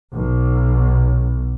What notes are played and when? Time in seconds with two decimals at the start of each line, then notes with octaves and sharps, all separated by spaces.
0.14 B1